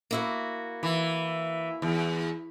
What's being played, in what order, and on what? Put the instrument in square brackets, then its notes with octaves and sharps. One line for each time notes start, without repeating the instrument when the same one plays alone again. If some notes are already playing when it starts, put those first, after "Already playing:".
[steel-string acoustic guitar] A#3 E4 F#4
[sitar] E3 [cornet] E5
[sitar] E2